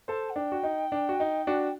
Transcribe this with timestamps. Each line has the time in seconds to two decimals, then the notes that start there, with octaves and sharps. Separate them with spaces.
0.08 A4 C5 A5
0.30 F#5
0.36 D4 G5
0.52 F#4
0.63 D#4
0.92 D4
1.09 F#4
1.20 D#4
1.47 D4 F#4